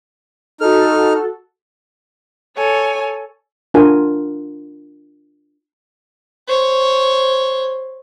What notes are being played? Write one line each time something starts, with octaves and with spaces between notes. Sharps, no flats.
D#4 F#4 A4 F6
A4 C#5 G#5
D4 F4 A#4 F#5 G#5
C5 C#5